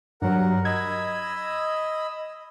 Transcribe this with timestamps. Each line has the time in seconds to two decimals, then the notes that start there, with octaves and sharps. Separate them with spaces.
0.22 G2 F#3 A#4 F#5
0.65 D#5 B5 E6 G#6